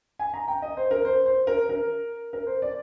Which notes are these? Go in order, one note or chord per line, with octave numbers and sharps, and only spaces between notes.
G#5
A#5
G5
D#5
C5
A#4
C5
C5
A#4
A#4
A#4
C5
D5